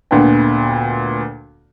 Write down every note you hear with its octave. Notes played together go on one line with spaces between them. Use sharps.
D2 A#2 D3 B3 B4 G5